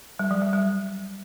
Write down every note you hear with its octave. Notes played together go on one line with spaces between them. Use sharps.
G3
F#3
G3
G3